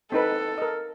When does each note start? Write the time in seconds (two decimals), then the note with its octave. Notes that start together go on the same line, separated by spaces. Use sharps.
0.12 C4 D#4 A4 B4
0.58 A#4 D#5